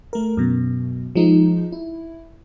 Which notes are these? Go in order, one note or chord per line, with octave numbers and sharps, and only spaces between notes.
A3 A#4
F#2 B2
F3 G#3 D#4
E4